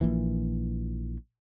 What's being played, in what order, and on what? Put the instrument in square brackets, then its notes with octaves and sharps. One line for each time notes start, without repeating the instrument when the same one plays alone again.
[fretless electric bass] A#1 A#2 E3